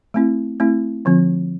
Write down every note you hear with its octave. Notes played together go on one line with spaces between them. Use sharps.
A3 C4 E4
A3 C4 E4
D3 F3 C4 F4